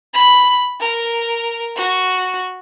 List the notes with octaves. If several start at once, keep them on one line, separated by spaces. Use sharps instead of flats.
B5
A#4
F#4